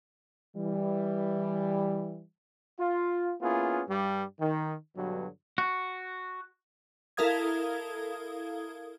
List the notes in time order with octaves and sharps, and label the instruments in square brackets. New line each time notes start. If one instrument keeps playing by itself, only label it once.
[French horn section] E3 G3
[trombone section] F4
A#3 B3 C#4 E4 F4 G#4
G2 G3
D#3
G2 B2 D3 F#3
[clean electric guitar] F#4
[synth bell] E4 A4 A#4 F5 D#6 G#6